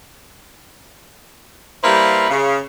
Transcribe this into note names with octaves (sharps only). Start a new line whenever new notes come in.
G3 A#3 E4 B4 C5 F5
C#3